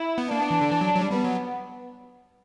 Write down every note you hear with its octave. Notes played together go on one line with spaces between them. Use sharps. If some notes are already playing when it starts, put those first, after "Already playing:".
Already playing: E4
B3
A#3 D4
B3
E3
D3
E3
F#3
F#3
G3
G3 B3
F#3